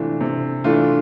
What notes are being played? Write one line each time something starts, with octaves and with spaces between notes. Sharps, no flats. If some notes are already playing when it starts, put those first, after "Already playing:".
Already playing: C3 E3 A3 D4 F4
C3
E3 A3 D4 F4